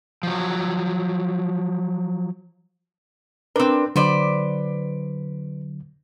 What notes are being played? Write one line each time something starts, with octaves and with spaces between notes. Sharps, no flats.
F3 F#3
C4 D4 A#4 B4
D3 F#3 B4 C5 D5